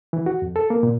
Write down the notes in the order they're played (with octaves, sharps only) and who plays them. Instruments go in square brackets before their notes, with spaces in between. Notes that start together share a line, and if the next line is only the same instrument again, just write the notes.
[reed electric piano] E3
F#4
F2
A4
A#3
A#2